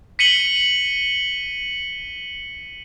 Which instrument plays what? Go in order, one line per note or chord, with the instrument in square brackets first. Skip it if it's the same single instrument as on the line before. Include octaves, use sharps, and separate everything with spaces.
[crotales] B6 C#7 D#7 F#7 G7